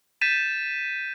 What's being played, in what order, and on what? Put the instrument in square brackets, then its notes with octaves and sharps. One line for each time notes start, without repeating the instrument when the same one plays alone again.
[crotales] G6 A6 B6 D#7 E7